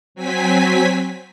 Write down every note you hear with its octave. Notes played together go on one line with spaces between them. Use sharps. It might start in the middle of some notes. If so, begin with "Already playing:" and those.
F#3 C4 G#5 B6